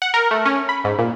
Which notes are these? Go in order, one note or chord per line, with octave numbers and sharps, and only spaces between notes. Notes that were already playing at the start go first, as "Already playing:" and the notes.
F#5
A#4
A3
C#4
B5
G#2
A#2